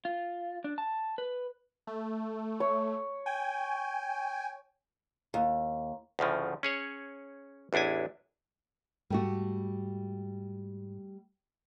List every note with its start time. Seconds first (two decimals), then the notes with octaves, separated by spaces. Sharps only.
0.05 F4
0.64 D4
0.78 A5
1.18 B4
1.87 A3
2.60 C#5
3.26 G5 G#5
5.34 D#2
6.19 D2 A2 C#3 F3
6.63 C#4 G#4 C#5
7.73 A1 E2 D4 E4 G#5
9.10 G#2 G3 A3 F#4